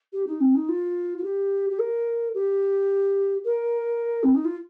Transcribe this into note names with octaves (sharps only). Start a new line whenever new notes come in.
G4
D#4
C4
D#4
F4
F4
G4
G4
A#4
G4
A#4
C4
D#4
F4